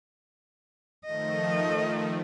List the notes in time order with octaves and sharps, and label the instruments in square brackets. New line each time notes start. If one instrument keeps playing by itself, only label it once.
[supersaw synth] D#3 F3 A3 [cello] D#5